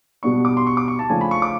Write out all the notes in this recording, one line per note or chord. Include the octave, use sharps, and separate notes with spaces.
B2 G3 B3 D4 C#6
D6
C6
C#6
D6
C#6
A5
C#3 F3 A3 D4 G#5
B5
C#6
D6